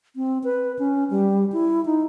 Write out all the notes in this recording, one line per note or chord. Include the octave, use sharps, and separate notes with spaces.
C4
B4
C#4
G3
E4
D#4